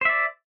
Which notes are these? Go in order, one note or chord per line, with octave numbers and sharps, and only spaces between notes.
C5 D5 E5